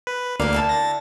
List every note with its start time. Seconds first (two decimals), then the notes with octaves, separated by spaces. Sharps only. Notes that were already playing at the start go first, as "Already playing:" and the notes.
0.07 B4
0.40 D2 E3 A#3 D5 F5
0.53 D3 E4 A5
0.69 A6 A#6